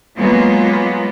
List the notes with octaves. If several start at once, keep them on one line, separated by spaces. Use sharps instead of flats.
F#3 G#3 A#3 B3 F4